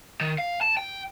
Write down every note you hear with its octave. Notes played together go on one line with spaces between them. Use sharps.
D#3
F5
A5
G5